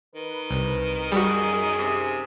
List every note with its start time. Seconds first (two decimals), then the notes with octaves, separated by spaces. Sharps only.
0.15 D#3 B4
0.51 C2
1.12 F#2 G3 F#4 G#4
1.79 C3